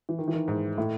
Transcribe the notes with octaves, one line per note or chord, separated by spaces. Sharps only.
E3
D#3
E3
D#3
G#2
A2